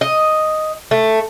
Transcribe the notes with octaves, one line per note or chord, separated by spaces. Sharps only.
D#5
A3